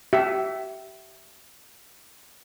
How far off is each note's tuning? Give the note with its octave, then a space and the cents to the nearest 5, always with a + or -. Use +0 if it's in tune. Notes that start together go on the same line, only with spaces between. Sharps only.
G4 -30 E5 +0